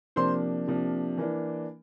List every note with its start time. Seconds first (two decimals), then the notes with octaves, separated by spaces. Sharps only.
0.16 C3 F3 A#3 D4 C5 C6
0.67 C3 F3 A#3 D4
1.18 E3 A#3 D4